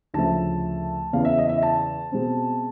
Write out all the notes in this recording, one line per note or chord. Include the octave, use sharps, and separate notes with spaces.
D2 C#3 F3 A3 A5
E2 C#3 E3 F5
E5
D#5
E5
A5
B2 G#3 C4